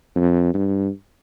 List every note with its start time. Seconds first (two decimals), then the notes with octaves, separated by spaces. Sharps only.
0.15 F2
0.54 G2